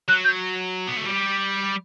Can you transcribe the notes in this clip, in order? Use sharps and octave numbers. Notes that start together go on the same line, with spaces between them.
F#3 F#6
G6
B3
A3
G3